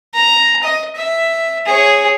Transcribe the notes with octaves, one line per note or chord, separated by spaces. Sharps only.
A#5
D#5
E5
G#4 C#5